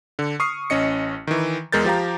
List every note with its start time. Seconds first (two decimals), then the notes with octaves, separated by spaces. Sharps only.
0.19 D3
0.40 C#6 D#6 F6 C7
0.70 A1 C#4 D#5 C#7
1.27 D#3 E3
1.72 E2 G#3 A#4 G6 A6
1.85 F3 G4 F5 A#5